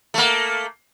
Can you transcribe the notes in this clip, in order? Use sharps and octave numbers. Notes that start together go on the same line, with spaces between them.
A3 A#3